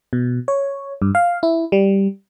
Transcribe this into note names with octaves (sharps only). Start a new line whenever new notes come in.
B2
C#5
G2
F5
E4
G3